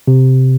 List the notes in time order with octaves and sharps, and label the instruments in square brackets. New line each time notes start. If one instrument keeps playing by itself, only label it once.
[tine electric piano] C3